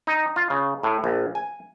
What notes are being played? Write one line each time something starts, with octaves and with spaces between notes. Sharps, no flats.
D#4
F4
C#3
A2
A#1
G#5